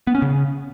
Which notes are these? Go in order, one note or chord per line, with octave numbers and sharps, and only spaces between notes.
B3
C#4
C#3